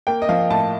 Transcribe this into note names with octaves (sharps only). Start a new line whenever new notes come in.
A#3 G5
D#5
F3 F5
A2 A5